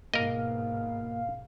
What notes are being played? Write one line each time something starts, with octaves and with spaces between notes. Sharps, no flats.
G#2 B2 A#3 A#4 D#5 F5